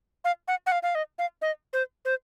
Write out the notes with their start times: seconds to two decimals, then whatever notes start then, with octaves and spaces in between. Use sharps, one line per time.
0.25 F5
0.48 F#5
0.66 F#5
0.72 F5
0.83 F5
0.95 D#5
1.19 F5
1.42 D#5
1.73 C5
2.05 C5